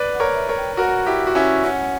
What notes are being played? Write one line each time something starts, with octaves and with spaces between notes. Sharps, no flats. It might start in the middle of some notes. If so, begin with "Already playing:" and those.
Already playing: B4 D5
F#5
A#4 C#5
E5
A#4 C#5
G5
F#4 A#4 F#5
E4 G4
F#4
C#4 E4
C#4 F#5